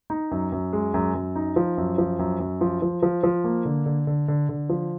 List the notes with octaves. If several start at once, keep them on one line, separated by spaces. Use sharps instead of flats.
D#4
F#2
F#2
G#3
F#2
F#2
D#4
F3
F#2
F3
F#2
F#2
F3
F3
F3
F3
A#3
D3
D3
D3
D3
D3
F3